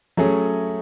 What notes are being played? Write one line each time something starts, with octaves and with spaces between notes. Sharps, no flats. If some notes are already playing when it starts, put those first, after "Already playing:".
F#3 A3 C#4 G#4